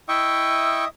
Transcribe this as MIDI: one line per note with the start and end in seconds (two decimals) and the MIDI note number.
0.09 0.85 64
0.09 0.88 75
0.09 0.88 76
0.09 0.85 79
0.09 0.85 85
0.09 0.88 87
0.09 0.84 88